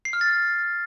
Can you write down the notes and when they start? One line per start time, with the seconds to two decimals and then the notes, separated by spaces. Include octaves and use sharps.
0.05 C7
0.13 F6
0.21 A6